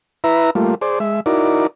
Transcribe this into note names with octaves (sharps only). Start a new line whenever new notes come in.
E4 B4 E5 A#5
G3 A3 A#3 F4
G#4 C5 D5
G#3 E5
D#4 E4 F#4 A#4 D5